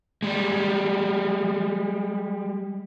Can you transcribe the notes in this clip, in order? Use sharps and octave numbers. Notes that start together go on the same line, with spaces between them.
G3 G#3